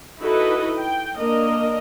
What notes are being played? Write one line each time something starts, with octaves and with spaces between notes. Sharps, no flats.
D#4 E4 F#4 A4 B4 D#5
G5
A#3 D4 A#4 D#5